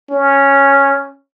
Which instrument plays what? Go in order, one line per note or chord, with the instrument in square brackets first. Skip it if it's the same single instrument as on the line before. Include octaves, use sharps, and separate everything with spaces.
[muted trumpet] C#4